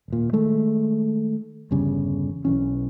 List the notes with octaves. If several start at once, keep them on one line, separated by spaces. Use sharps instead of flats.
D#1 A#2
D#3 G#3 A3
G1 E2 C#3 G3
B1 E3 C#4